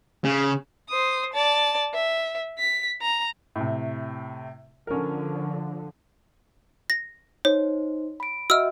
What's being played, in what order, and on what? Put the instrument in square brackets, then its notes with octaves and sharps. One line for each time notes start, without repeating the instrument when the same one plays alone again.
[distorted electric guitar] C#3
[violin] C5 D#6
D5 A5
E5
B6
A#5
[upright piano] A2 C3
[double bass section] D3 F3 [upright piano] C#4 A#4
[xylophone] A#6
[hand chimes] D#4 C5 [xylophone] C#5
[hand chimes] B5 D7
[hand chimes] F#4 D#5 E5 [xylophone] E6 F6